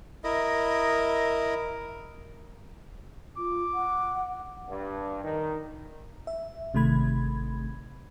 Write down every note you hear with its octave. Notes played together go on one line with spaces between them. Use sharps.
E4 A#4 D#5
F4 D6
F#5
G2
D#3
E5
G#1 C3 D#3 A3 B5 G#6